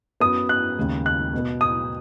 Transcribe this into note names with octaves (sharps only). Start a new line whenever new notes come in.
F#2 F#3 B3 D#6
F#6
D#2 C#3 G#3
F#6
B2 B3
D#6